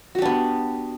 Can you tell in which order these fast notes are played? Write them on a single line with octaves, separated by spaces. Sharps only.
F#4 G4 D4 B3